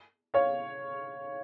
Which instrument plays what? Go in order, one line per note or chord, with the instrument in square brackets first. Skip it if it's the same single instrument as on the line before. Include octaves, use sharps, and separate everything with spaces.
[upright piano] C#5 F5